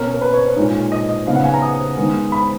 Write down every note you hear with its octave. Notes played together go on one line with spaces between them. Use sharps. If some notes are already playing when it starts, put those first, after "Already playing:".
Already playing: B2 A#3 C#4 A#4
A#4
B4
C#5
C#5
A#2 G#3 D#4
D#5
D#5
C#3 F#3 B3 D#4 F5
F#5
G#5
A#5
D#6
D#3 G#3 B3 D#4
B5